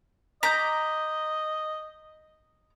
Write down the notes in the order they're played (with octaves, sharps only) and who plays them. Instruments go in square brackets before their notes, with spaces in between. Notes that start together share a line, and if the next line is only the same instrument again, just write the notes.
[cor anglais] D#5 [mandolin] A#5 D6 [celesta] G6 B6